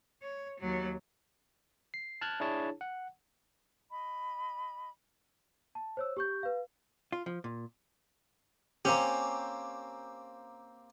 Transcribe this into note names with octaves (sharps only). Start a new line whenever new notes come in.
C#5
D#2 F#3
C7
A5 F6 F#6 G#6
D4 E4 G#4 C#5 A5
F#5
D#5 B5
A5
C5 C#5 E6
G4 C#6 G6
B4 F5
F4
F3
A#2
A#3 C4 C#4 G4